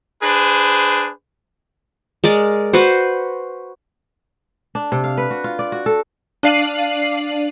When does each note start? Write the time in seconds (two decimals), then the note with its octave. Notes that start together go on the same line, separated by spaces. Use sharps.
0.23 D4 G#4 B4 C5
2.24 G#3 A#4 D5
2.73 F#4 B4 C5
4.75 D4
4.92 C3
5.04 F5
5.18 B4
5.31 F#4
5.44 F4
5.59 D5
5.72 F#4
5.86 A4
6.43 D4 D5 F5 C7 D#7 F#7